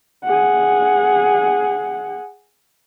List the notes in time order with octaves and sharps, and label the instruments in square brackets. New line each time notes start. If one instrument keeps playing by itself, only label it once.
[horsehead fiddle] G#4 F#5